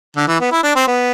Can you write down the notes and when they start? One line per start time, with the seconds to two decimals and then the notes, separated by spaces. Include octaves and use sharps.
0.17 D3
0.28 E3
0.41 B3
0.52 E4
0.64 D4
0.76 C4
0.87 B3